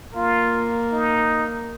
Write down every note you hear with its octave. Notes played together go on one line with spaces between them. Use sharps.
A#3 F4
D#4